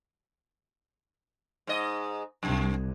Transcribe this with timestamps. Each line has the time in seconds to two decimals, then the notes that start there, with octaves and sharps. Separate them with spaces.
1.67 G#2 D#5
2.43 C2 F#2